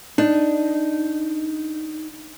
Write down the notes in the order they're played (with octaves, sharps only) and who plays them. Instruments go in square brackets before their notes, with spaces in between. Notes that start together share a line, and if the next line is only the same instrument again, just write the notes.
[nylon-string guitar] D4 [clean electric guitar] D#4